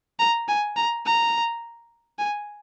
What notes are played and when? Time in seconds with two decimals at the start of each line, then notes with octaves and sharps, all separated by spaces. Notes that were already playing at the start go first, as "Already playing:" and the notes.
0.19 A#5
0.48 G#5
0.76 A#5
1.06 A#5
2.19 G#5